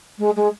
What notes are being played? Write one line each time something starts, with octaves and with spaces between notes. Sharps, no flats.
G#3
G#3